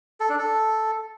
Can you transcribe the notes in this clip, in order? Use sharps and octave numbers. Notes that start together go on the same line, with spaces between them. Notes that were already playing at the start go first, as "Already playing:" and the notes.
A4
D4
A4